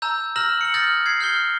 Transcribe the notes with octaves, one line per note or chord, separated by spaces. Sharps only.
A5 A#5 E6 G6
A#5 E6 F6 A#6 E7 F#7
C#7 F#7
D#6 F6 G6 A6 A#6
G#6 C7
F6 G6 C7 G7